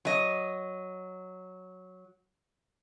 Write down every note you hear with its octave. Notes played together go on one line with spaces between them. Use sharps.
F#3 D#5